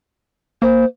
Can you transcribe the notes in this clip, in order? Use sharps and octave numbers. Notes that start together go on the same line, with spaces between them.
A#3 C5